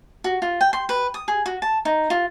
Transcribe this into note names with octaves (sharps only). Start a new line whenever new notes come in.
F#4
F4
G5
C6
B4
D#6
G#4
F#4
A5
D#4
F4